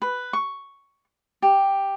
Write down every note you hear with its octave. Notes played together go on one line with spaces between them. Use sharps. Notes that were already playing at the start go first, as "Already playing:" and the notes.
B4
C#6
G4